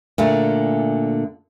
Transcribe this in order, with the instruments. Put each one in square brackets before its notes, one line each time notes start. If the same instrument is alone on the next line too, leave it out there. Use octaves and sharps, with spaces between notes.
[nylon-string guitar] A#2 D3 A3